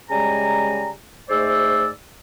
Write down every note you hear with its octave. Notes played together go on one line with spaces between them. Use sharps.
C#3 G3 G#3 G#5 A#5
G#2 G#3 A3 C5 D5 E6